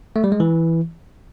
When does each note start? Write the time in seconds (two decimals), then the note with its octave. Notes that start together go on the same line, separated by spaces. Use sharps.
0.16 A3
0.24 G3
0.32 G#3
0.40 E3